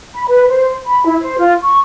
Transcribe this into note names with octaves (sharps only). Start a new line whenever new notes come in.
B5
B4
C5
B5
E4
C5
F4
C#6